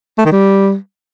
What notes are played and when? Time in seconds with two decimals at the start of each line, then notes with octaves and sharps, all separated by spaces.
0.18 A3
0.25 D#3
0.32 G3